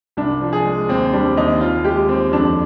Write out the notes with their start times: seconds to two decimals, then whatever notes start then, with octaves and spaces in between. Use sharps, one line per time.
0.17 C2 D4
0.41 F3
0.53 G#4
0.66 G#3
0.89 D#2 C4
1.13 G3 D4
1.36 D#2 D#4
1.61 D#2 F4
1.84 G#3 G4
2.08 D#2 C4
2.32 F2 D4